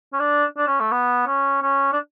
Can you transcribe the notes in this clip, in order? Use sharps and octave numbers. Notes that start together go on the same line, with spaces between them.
C#4
D4
D4
C#4
A3
B3
C#4
C#4
D4